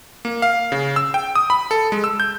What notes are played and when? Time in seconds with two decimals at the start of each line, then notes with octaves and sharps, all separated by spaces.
0.25 A#3
0.42 F5
0.72 C#3
0.96 E6
1.14 G5
1.35 D#6
1.50 B5
1.71 A4
1.92 G#3
2.04 E6
2.20 G6